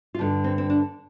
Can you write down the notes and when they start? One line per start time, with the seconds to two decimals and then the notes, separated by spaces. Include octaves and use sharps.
0.15 F4
0.18 G2 D3 D#4
0.44 C4
0.58 C4
0.70 D4